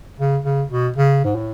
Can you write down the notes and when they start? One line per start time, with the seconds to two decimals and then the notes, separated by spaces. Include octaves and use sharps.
0.19 C#3
0.45 C#3
0.71 B2
0.96 C#3
1.24 G#2
1.35 A2